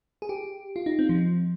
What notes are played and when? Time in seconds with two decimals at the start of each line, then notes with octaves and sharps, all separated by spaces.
0.22 G#4
0.29 G4
0.76 F4
0.86 D#4
0.99 C4
1.09 F3